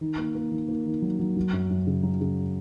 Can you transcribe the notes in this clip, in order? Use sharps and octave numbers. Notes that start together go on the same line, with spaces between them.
D#3
A#3
A#3
D#3
A#3
D#3
F#3
F#3
F#3
F#2
F#2
C#3
F#3
C#3